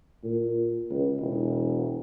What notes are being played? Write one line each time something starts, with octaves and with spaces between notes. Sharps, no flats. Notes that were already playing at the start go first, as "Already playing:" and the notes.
A#2
C#2
E1